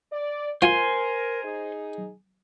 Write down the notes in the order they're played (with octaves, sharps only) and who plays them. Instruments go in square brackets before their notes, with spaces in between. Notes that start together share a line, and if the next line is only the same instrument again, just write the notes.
[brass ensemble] D5
[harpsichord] F4 [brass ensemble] A#4 [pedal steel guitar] C5 G#5 C6
[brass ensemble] D#4 G#4